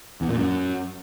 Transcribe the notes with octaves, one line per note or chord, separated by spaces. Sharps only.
E2
A#2
F#2